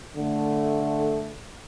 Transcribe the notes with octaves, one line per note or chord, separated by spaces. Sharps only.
D3 A3